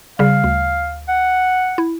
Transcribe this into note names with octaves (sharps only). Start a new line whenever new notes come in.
C#3 G3 F5
D2
F#5
E4